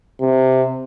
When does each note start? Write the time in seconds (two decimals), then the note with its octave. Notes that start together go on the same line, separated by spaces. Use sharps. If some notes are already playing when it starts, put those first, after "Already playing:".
0.21 C3